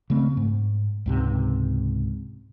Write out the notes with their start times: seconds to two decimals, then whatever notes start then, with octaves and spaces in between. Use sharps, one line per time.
0.10 C#3 A3 C4
0.37 G#2
1.06 C#2 G#2 C3